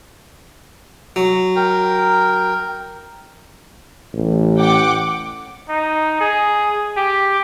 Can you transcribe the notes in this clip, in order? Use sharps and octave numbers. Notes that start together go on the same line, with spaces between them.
F#3
A#4 G5
A1
F#5 G5 D6
D#4
G#4
G4